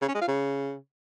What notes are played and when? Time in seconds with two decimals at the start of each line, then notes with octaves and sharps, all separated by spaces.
0.01 C#3
0.08 C#4
0.15 G#3
0.21 F4
0.28 C#3